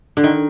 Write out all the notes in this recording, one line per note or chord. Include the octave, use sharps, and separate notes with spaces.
D3
D#3